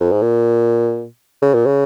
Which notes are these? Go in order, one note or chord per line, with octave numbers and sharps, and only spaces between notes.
F2
G#2
A#2
C#3
A#2
C#3